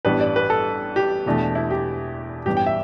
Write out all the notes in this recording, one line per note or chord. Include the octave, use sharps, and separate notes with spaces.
A1 G2 G3 B3 D4 B4
D5
B4
A4
G4
E1 E2 B2 A3 D4
E4
G4
A1 G2 G3 B3 G4
G5
E5